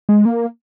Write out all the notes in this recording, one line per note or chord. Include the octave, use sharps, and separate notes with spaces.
G#3
A#3